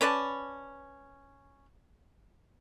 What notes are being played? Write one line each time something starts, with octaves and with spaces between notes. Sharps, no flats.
C#4 B4 D5 A5